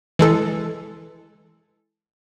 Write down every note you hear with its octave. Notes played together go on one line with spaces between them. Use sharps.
E3 G#3 A4